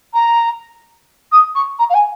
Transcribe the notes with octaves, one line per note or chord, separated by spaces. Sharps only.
A#5
D#6
C#6
A#5
F5
G#5